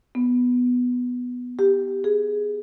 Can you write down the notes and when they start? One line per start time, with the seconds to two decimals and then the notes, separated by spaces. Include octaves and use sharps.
0.15 B3
1.59 G4
2.04 G#4